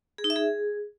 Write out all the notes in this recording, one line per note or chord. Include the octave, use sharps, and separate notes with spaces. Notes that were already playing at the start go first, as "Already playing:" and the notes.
G#4
D#4
E5
G#4